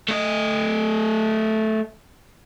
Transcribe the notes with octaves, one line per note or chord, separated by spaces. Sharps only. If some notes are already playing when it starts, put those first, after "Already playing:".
A3 D#5